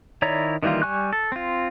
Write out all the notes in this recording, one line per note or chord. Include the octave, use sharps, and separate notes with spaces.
D#3 E4 C#5 D5 A#5
D#3 E3 G3 A#3 F4
G3 G#5 C#6 F#6
A4
C4 F4